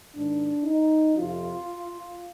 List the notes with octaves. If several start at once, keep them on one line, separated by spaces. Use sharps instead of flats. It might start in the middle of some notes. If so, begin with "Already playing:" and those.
G#2 D#3 D4
D#4
F2 C3 F3 F4